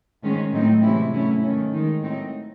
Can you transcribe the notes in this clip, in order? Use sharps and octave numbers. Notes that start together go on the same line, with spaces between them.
G#2 D#3 G#3 C#4
A2 F#3 C4 D#4
C3 E3 G#3 C#4 E4
G#2 F#3 A3 C#4 E4
D#3 A3 C#4
D#3 G#3 D#4
A2 F#3 C4 D#4